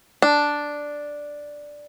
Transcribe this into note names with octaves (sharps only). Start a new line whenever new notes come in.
D4